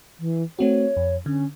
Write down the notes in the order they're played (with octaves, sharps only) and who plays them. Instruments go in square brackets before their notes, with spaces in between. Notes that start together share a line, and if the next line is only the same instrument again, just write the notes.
[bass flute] E3
[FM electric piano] A3 C4 F#4 [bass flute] C#5
[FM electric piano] F2
[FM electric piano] D3 [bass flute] C#4